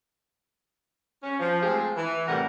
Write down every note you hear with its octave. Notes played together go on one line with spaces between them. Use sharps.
C#4
F3
G#3 A3 C4 F4 G4 G#4
E3
A2 C3 G3 A#4 F#5